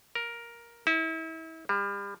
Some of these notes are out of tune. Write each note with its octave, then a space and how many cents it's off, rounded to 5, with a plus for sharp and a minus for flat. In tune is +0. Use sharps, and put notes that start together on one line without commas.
A#4 +10
E4 -35
G3 +35